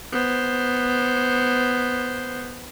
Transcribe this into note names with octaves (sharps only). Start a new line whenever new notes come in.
B3 C5